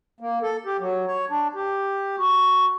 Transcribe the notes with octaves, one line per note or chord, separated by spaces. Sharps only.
A#3
A4
G4
F#3
C#5
D4
G4
F#4